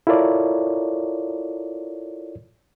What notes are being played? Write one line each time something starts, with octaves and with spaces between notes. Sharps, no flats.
E4 F4 A4 A#4 C#5 D5